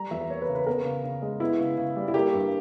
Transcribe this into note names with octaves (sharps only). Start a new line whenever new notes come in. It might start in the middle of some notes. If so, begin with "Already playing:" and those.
Already playing: G3 A#5
E2 E5
A#3 C#5
B4
C#3
B4
B3 A#4
C#3
C#3
G#3
B3 E4
C#3
C#3
G3
E4
A#3 G4
G2